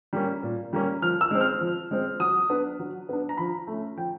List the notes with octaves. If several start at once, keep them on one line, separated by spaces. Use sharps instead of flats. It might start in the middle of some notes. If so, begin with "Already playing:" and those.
G3 A#3 C#4
A#2
G3 A#3 C#4
F3 F6
E6
G#3 C4
F6
F3
G#3 C4
F#3 D#6
B3 D4
F#3
B3 D4
A#5
F3 B5
A3 C#4
F3 G5